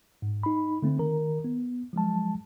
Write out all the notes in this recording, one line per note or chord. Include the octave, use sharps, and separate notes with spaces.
G#2
D#4 B5
D3 A3 C4
D#3 A#4 A#5
B3
F3 F#3 G#3 A5